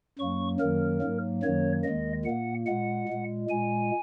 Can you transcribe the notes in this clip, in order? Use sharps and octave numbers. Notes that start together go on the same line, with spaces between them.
F#2 F#3 A#3 C#6
F#2 D#3 F#3 A#3 A#4
G#2 F#3 A#3
F#2 D#3 F#3 A#3 C#5
D#2 D#3 G#3 D#5
A#2 A#3 F#5
A#2 G#3 F#5
A#2 G#3
A#2 G#3 G#5